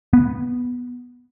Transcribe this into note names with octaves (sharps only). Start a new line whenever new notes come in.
B3